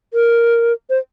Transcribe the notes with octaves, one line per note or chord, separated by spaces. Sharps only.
A#4
C5